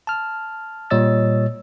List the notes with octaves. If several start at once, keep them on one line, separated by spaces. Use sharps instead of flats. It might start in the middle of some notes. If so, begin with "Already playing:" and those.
A5 F6
A#2 G3 C#5 D#5 E6 A6